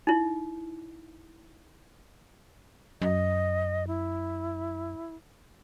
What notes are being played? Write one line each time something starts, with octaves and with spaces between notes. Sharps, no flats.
D#4 E4
F#2 D#5
E4